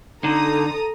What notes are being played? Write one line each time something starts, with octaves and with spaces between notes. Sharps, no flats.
D3 D#4 A4 A#5 D#6